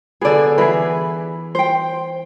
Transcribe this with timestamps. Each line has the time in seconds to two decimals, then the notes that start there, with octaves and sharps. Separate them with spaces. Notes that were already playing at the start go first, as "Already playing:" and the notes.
0.21 D3 B3 G#4 D5
0.58 E3 G#4 B4
1.55 C5 G5